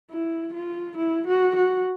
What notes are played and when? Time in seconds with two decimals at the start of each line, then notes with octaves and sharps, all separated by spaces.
0.11 E4
0.54 F4
0.97 E4
1.27 F#4
1.56 F#4